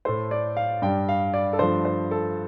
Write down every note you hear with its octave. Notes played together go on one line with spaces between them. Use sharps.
A2 A3 C5
D5
F5
G2 G3 G5
F5
D5
A4
G2 D3 F3 A3 C5
C5
A4